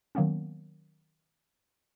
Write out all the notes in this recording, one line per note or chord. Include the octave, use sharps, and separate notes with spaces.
D#3 F#3 A#3 B3 C#4